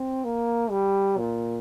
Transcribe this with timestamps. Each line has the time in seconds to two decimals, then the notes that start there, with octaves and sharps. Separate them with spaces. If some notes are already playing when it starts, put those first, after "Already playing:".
Already playing: C4
0.25 A#3
0.71 G3
1.18 A#2